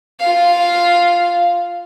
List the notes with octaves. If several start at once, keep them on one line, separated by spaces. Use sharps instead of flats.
F4 F5